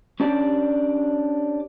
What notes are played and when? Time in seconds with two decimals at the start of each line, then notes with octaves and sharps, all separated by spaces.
0.20 C#4 D4 G4 D5